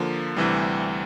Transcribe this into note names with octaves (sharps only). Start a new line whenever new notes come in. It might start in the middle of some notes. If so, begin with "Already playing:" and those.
Already playing: D3 F3 A#3
D2 C3 E3 G3